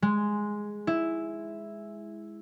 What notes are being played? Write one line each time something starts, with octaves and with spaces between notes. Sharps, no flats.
G#3
E4